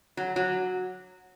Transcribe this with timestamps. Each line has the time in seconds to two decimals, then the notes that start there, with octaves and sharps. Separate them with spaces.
0.17 F#3
0.36 F#3